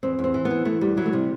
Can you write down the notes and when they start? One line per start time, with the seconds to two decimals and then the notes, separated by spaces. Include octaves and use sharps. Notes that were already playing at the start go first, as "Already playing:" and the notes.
0.03 E2 C4
0.19 E2
0.24 C4
0.34 E3
0.45 B3
0.50 E3
0.65 E3 A3
0.81 E2 G3
0.97 E3 F#3
1.06 A3
1.13 C3 G3